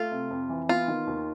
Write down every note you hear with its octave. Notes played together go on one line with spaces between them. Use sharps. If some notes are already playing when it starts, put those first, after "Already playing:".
Already playing: A3 F4
C3
F2
E3
B3 F4
D#3
D#2